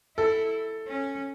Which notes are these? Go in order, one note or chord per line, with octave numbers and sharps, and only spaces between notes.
E4 A4
C#4